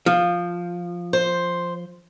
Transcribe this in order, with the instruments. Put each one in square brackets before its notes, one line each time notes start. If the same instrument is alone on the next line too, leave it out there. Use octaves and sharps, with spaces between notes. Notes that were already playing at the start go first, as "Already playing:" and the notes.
[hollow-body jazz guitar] F3
[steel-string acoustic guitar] C5